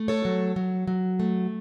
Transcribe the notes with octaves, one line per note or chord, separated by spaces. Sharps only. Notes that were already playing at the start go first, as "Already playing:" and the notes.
Already playing: A3
A4 C#5
F#3
F#3
F#3
A3